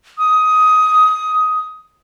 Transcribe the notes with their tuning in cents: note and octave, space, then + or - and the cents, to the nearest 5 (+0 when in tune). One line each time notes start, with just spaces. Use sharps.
D#6 +15